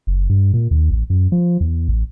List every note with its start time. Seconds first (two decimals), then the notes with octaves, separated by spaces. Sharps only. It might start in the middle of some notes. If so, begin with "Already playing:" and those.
0.07 F#1
0.30 G2
0.54 A#2
0.71 D#2
0.91 A1
1.10 F#2
1.32 F3
1.61 E2
1.89 A1